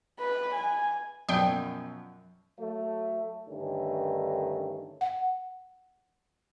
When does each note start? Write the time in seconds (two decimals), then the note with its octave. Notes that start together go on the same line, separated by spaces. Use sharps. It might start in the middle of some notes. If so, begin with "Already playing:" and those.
0.19 B4
0.54 G#5
1.29 F#2 B2 F3 F#3 D5 G5
2.59 F#3 A3
3.49 G2 D3 D#3 A3 C#4
5.01 F#5